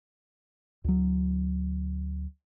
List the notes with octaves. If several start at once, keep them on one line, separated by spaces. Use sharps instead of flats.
D2 F#3